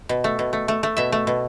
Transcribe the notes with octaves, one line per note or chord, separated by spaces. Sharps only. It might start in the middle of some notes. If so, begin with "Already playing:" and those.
B2
A3
B2
A3
A3
A3
B2 E5
A3
B2